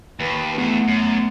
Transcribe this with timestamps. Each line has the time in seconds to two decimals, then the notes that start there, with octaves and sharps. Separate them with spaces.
0.20 D#2 B4
0.58 E2 A3 B3
0.88 F#2